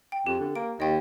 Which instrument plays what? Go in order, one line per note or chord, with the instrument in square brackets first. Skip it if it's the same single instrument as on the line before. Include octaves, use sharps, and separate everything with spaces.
[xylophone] G5
[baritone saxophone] F2 [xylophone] G4
[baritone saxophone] D3
[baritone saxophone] A#3 [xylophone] D7
[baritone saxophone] D#2 [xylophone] D#5 G5